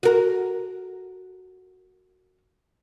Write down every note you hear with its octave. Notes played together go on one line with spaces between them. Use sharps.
F#4 A#4